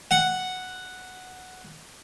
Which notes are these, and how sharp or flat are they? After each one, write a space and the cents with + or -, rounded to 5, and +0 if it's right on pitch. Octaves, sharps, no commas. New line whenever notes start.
F#5 +0